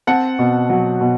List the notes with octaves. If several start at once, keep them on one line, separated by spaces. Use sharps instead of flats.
C4 F#5 A5
B2
F#3
B2